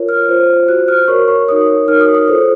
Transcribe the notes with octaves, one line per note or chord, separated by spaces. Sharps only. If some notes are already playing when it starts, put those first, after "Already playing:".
Already playing: F4 A#4 C#5
F6
F4 C5
F#4 C5 F#6
F6
F#4 A#4 C#5 C#6
C#6
D#4 F#4 A#4 C#5 D#6
D#4 A#4 C#5 F6
D#6
D#6
F4 A4 C5 D#6